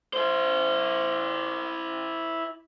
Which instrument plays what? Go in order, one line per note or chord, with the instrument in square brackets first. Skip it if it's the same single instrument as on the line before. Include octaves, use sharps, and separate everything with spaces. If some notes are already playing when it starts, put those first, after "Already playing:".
[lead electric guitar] E4 C5